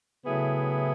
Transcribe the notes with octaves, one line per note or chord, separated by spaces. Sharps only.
A2 C#3 F#3 B3 E4 G#4